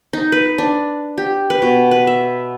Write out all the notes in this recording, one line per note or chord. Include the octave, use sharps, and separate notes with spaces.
D#4
B4
D4
G4
B4
B2
B4
E5